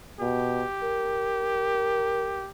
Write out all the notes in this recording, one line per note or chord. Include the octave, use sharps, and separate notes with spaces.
B2 G4
A#4